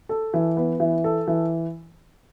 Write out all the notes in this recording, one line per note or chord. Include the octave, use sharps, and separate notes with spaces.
A4
E3
B3
E3
A4
E3